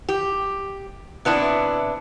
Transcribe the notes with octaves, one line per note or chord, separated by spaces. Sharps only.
G4
C3 B3 D4 E4